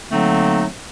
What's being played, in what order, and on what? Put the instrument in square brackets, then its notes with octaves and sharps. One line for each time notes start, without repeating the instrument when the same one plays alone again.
[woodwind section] D3 F#3 A3 A#3 C4 D#4